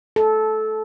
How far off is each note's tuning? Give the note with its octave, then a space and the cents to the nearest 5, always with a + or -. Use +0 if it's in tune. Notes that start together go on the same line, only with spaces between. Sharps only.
A4 -15